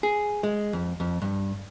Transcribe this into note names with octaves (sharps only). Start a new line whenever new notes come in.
G#4
G#3
F2
F2
G2